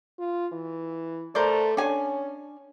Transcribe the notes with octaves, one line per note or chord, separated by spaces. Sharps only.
F4
E3
A3 A#4 C5 D5
C#4 D4 G#5